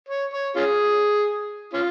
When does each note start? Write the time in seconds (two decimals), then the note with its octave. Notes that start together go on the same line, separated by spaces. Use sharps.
0.09 C#5
0.33 C#5
0.56 C#4 F4 G#4
1.73 C#4 F4